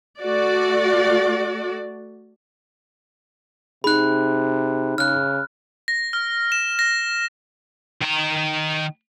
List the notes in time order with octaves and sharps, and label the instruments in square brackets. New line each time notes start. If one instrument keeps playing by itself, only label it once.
[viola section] A3 F#4 D5
[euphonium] C3 [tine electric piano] D#4 G#4 [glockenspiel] B5 F#6
[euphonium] C#3 [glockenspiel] F6 F#6
[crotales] A#6
F6
E7
A#6
[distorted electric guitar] D#3 A#5